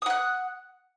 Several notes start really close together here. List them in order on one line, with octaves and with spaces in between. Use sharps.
D#6 F#5 F#6